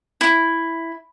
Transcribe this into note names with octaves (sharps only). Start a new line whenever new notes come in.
E4